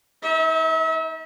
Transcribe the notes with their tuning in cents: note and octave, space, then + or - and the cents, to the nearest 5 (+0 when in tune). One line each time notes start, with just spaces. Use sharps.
D#4 +30 E5 -35